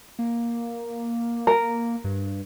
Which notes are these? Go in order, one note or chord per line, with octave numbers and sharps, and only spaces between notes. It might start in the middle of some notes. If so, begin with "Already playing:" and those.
A#3
A#4
G2